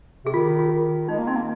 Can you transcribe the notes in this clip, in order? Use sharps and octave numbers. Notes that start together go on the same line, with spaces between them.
C3 G#4
D#3 F4
F4
D#3
G#3 D#4
A#3
C4 D#4
A#3